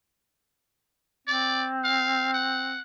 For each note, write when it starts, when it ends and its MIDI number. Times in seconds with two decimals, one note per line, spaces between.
1.27 2.79 60
1.27 1.68 74
1.84 2.30 77
2.34 2.82 78